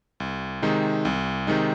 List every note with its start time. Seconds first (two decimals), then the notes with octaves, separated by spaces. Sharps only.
0.20 C2
0.62 C3 D#3 G#3 D#4
1.05 C2
1.47 C3 D#3 G#3 D#4